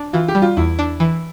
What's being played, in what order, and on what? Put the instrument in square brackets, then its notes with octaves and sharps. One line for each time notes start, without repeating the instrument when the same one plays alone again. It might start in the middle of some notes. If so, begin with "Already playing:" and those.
Already playing: [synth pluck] D4
[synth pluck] E3 [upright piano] F4
[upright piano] G4
[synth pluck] G3
[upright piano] F4
[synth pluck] E2 [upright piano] E4
[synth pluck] D4
E3